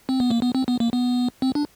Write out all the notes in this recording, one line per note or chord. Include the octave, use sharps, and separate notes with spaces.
C4
B3
A#3
B3
C4
B3
A#3
B3
C4
D4